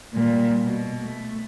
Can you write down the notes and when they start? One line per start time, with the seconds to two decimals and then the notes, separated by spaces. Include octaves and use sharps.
0.14 A#2 G3
0.65 B2
1.01 A3